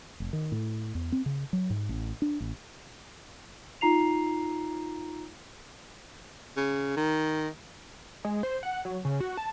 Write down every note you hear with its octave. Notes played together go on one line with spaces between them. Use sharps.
F1
D#3
A2
E2
C4
C#3
F#3
G#2
A1
D4
A1
D#4 F4 A#5 C7 F7
C#3
D#3
G#3
C5
F#5
F#3
C#3
F#4
A5